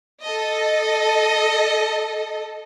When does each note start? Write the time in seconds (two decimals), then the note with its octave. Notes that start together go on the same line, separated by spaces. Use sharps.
0.23 A4 D#5